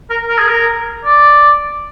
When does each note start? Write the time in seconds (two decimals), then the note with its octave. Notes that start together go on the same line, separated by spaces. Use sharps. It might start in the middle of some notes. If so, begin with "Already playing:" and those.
0.10 A#4
0.29 A#4
0.39 G#4
0.48 A#4
1.05 D5